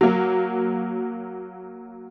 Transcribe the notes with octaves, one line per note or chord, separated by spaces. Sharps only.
F#3 A#3